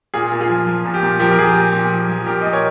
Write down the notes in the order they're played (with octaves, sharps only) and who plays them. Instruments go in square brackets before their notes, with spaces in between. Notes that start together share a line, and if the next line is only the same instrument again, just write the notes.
[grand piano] A#2 F4 G#4
A#2
F4 G#4
F3
F3
A#2
G4
A#2
F3 G4 A#4
A#4
F3 G#4
G4
A#2
A#2
F3
F3
A#2 G4 A#4
A#2 D#5
A#4 C#5